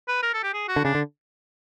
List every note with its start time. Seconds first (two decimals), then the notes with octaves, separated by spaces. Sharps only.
0.08 B4
0.23 A#4
0.34 A4
0.43 G4
0.54 G#4
0.68 F#4
0.76 D3
0.84 C#3 D4
0.95 D3